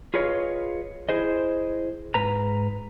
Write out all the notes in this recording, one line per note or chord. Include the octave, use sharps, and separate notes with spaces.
F4 G#4 B4 C#5 D#5 F5
E4 G#4 C5 D#5
G#2 B4 A#5